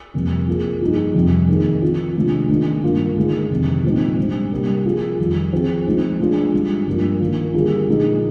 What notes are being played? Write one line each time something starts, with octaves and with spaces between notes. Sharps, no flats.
F2 C3 G3 A#3
F3 A#3 F4 G#4
G2 F3 A#3 D#4 G#4
F2 C3 G3
D#3 A#3 D#4 G#4
F3 C4 F4
C3 D#3 G#3 D4 F4
D#3 G#3 D4
G2 D#3 A#3 F4
D3 G#3 D#4 G#4
F2 C3 D#3
A#2 F3 G#3 C4 D#4
G#2 G3 D4
C3 G3 A#3
F3 A#3 F4 G#4
F2 D#3 G3
F3 C4 F4 G#4
F3 G#3 C4 D#4
F3 G#3 D4 F4 G#4
G#2 G3 D4 F4
G2 F3 A#3
D#3 A#3 F4
D3 G3 A#3 F4 G#4
A#2 F3 G#3 D#4 G#4